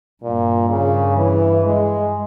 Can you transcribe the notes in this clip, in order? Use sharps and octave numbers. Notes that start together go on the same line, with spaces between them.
G2 A#2
C#3
E3
G#3